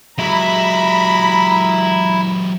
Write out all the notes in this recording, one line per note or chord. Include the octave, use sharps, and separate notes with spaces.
F#3 G#3 E4 A#5 B5